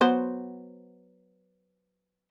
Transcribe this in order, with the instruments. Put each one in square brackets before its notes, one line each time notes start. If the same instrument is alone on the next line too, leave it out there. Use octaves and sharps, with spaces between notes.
[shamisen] F#3 B3 C5